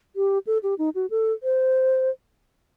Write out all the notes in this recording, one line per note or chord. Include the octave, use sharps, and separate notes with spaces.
G4
A4
G4
D#4
F#4
A4
C5